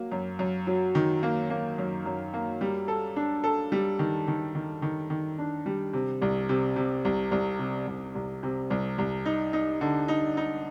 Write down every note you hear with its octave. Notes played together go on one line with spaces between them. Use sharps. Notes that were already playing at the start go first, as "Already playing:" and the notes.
Already playing: F#3 A#3
F#2
F#2
F#3
D#3
A#3
A#3
F#2
F#2
A#3
G3
A4
D4
A4
G3
D#3
D#3
D#3
D#3
D#3
D4
G3
C3
C2
C3
C3
C2
C2
C3
C2
C2
C3
C2
C2
D#4
D#4
D3
D#4
D#4